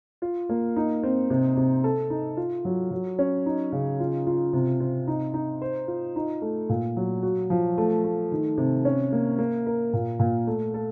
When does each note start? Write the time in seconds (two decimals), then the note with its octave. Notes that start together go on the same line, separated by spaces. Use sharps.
0.22 F4
0.49 A#3
0.76 D#4
1.03 C4
1.30 C3
1.57 C3
1.84 A4
2.10 D#4
2.37 F4
2.65 F#3
2.91 F#3
3.19 C#4
3.46 D#4
3.72 C#3
4.00 F4
4.27 F4
4.53 C3
4.80 C4
5.07 D#4
5.34 D#4
5.61 C5
5.88 F4
6.16 D#4
6.42 A3
6.69 A#2
6.96 F#3
7.23 F#4
7.50 F3
7.78 A3
8.04 A3
8.32 D#3
8.58 C3
8.85 C#4
9.12 A#3
9.38 A#3
9.66 A#4
9.93 A#2
10.19 A#2
10.47 A3
10.74 A4